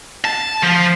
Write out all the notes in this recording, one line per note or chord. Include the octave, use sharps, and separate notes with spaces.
A5
F3